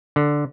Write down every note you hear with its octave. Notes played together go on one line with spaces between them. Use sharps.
D3